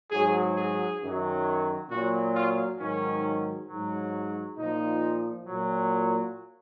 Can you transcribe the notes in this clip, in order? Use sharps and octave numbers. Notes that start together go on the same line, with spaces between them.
G#2 F#3 G#4
G#4
F#2 D#3 F#3
A#2 F#3 F#4
F4
G#2 D#3 F#3 C#4
G#2 F#3
A#2 F3 D#4
A#2 F#3